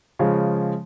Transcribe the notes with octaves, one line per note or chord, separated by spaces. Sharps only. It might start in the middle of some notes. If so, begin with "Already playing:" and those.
C#3 F3 G#3